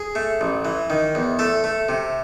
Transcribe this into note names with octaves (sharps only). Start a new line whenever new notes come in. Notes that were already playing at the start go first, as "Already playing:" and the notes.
Already playing: G#4
A3
A1
E3
D#3
E2
A3 A4
A3
C3